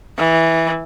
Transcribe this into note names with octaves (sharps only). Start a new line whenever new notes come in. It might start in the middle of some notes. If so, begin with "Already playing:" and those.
E3